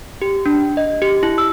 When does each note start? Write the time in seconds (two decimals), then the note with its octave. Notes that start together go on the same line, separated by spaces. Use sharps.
0.22 G4
0.46 D4
0.77 D#5
1.02 G4
1.23 E4
1.38 E6